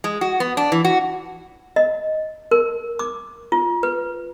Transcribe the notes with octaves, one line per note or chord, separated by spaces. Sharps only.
G#3
F#4
B3
D4
E3
F#4
D#5
A#4
D6
F4
B4